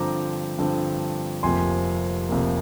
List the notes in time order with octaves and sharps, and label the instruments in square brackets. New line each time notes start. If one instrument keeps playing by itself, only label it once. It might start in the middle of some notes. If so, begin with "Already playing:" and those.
Already playing: [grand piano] G2 D3 F3 C4 A#5 D6
G2 D3 F3 C4
F1 F2 C3 F3 A#3 G#5 C6
F1 F2 C3 F3 A#3